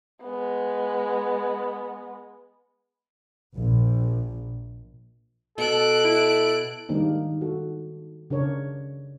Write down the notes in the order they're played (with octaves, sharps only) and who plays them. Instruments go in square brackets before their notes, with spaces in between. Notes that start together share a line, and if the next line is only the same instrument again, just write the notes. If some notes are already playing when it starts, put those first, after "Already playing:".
[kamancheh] G#3 B3
[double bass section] A#1
[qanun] B2 [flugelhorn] A4 [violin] F#6 D7
[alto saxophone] E4
[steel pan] D#3 G3 G#3 A#3 D4 D#4
F#4 A4
C#3 D4 A#4 C#5